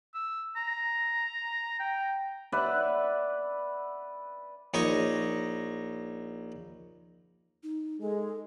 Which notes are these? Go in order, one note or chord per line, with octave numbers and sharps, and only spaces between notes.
E6
A#5
G5
B4 D5 E5 F#5
A#1 D#4 C#5 D#5 C#6
D#4
G#3 A4